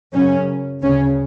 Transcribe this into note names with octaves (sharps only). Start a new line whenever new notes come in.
F#2 C#3 C#4
D2 C#3 C#4